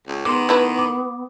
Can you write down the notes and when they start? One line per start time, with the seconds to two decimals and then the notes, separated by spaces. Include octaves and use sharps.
0.08 C#2
0.25 D#3 G#3 B3 C6 D6
0.49 A3 E4 B4
0.79 D6